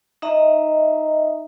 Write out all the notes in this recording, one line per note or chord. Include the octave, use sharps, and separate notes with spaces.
D#4 D#5 E5 A#5